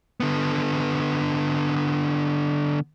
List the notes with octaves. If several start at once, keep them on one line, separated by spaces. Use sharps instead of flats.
D3 B3